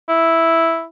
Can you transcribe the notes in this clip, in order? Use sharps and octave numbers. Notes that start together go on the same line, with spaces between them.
E4